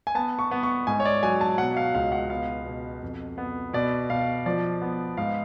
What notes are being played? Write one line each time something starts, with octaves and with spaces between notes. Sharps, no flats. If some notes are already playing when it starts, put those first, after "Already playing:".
G#5
B3 A5
C#6
B3
C#6
G#2 G#5
C#5
D5
F#3 G#5
A5
B2 F#5
F5
C#2 F5
F#5
B3 F5
B2
F2
B3
B2 D5
B2 F5
F3 D5
B3
G#2 F5